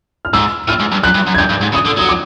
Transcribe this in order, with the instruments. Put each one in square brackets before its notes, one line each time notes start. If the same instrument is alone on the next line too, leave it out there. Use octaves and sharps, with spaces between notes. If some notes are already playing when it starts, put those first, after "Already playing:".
[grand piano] F6
[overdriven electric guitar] G#2 [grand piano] E6
[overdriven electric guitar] A2 [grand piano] F6
[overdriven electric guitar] G#2
G2
[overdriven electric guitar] F#2 [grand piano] F#6
[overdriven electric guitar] G2
F#2
[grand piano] G#6
[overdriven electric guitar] G2 [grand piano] G6
[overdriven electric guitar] G2
G#2
[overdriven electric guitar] C#3 [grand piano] D#6
[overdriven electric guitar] D3
[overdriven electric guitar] F#3 [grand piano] D#6
[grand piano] D6